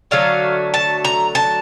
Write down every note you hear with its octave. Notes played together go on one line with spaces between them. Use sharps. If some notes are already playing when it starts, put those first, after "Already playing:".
D3 F#3 A3 F5
A5
A#5
A5